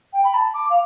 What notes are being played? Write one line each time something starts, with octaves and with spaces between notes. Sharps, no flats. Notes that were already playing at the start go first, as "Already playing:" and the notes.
G5
B5
A5
D6
F5